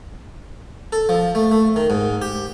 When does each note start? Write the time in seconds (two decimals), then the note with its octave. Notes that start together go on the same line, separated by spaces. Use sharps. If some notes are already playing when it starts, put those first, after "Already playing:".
0.92 A4
1.09 F3
1.35 A3
1.51 A3
1.76 D#3
1.90 G#2
2.22 G4